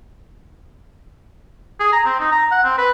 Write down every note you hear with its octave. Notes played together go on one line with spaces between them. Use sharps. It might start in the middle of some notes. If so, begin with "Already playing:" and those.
G#4
A#5
C4
D#4
A#5
F#5
C4
B4